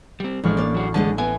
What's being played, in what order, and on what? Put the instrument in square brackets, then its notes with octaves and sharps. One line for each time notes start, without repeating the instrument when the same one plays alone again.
[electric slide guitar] G3 C4
[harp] A1 C#6 F6 [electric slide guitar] F3 D4 [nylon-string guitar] G#3
[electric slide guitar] A#3 [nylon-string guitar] D4 D5
[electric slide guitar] F#3 F#4 G#4
[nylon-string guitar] D3 G#3 A3 [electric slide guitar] E3 A5
[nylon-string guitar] B3 [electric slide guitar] E5 G#5